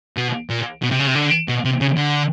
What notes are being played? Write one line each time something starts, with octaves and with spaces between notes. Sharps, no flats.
B2
A#2
B2
C3
C#3
C3
D3
B2
C3
C#3
D3